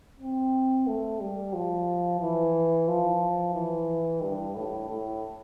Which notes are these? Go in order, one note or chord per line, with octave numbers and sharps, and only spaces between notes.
C4
A3
G3
F3
E3
F3
E3
G2
A2
A2